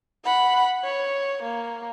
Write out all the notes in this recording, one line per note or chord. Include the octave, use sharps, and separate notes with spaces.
F#5 B5
C#5
A#3